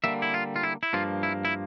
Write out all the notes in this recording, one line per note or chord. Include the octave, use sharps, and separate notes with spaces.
D3 G3 A#3 E5
E4
F4
F4
E4
E4
G2 F3 A#3 F4
E4
E4